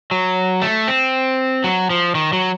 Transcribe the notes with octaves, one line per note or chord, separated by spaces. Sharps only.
F#3
A3
C4
F#3
F3
D#3
F#3